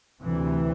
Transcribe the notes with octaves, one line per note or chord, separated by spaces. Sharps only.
D2 C3 E3